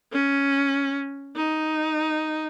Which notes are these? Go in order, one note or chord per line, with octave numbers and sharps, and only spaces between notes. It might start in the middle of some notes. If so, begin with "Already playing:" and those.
C#4
D#4